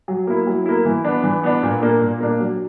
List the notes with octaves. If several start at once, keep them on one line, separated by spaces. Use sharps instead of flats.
F#3
A#3 E4
F#3
A#3 E4
E3
B3 D4
E3
B3 D4
A#2
A#3 D4
A#2
A#3 D4
F#3